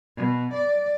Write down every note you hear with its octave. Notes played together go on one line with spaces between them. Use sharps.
B2
D5